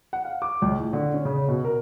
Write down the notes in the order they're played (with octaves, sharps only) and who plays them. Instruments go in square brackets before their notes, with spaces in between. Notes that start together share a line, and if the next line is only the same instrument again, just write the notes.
[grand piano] F#5
F5
D6
C#2
A2
D3
C#4
C#3
B2
A#4